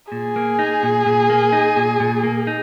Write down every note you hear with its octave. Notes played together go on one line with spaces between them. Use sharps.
A#2 G#4
A#3
D#4
A#2
A#2
A#3
D#4
A#2
A#2
A#3
D#4